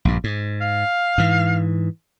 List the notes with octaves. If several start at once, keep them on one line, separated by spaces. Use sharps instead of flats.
A#1 G2
G#2
F5
G#2 E3